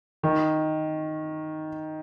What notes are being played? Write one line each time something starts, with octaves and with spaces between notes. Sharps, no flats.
D#3